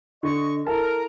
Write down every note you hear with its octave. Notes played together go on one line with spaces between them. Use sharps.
D3 D#5 C#6
E4 A4 A#4 A5